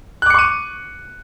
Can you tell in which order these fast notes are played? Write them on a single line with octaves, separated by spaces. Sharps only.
F#6 D6 C#7 C#6 D#7